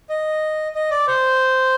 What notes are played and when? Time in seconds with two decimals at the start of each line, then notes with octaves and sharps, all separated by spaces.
0.09 D#5
0.75 D#5
0.91 D5
1.08 C5